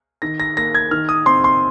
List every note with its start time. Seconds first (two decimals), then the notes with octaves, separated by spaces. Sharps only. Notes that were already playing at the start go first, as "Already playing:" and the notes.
0.22 D#3 A#6
0.40 A#6
0.57 A#3 A#6
0.75 G#6
0.91 D#3 F6
1.09 D#6
1.26 C4 C6
1.44 C6